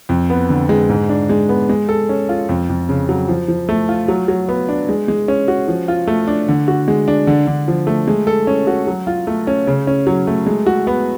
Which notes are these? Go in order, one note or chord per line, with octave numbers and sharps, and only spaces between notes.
F2
B3
D3
G#3
G#2
D4
G#3
B3
G#3
A4
C#4
F4
F2
F2
C#3
F#3
F3
F3
A3
F4
F#3
F#3
B3
D4
G#3
G#3
C#4
F#4
F3
F4
A3
D4
D3
F#4
G#3
D4
D3
D3
F3
A3
G#3
A4
C#4
F#4
F#3
F4
A3
C#4
C#3
C#4
F#3
A3
G#3
F#4
B3